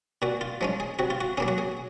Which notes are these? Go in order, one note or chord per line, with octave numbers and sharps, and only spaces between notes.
A#2 F#4
F4
F3 G#3 C#4
G#4
C3 F#4
F4
F#4
F#3 A#3 C#4 G#4
F#4
G#4